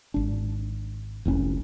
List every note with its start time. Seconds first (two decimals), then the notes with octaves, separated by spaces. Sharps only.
0.14 G#1 D4
1.25 F1 C2 C4 C#4